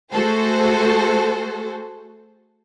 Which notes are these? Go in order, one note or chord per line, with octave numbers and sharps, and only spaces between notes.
A3 F#4 G#4 A4 C5